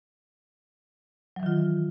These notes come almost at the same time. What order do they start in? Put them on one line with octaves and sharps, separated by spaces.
F#3 E3 D#3 F4